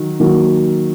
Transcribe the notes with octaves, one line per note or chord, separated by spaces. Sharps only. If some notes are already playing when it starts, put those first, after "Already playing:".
Already playing: D#3 F#3
D#3 F#3 A#3